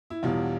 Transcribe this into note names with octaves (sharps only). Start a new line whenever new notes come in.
E4
E1 E2 B2 G3 F4